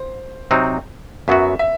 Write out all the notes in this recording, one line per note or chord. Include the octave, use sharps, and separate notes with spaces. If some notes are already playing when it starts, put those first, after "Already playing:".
Already playing: C5
C3 F#3 C4 D#4 F#4
F#2 F#3 B3 F#4 E5
E5